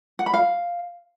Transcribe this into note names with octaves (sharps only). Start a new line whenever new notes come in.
F#5
B5
F5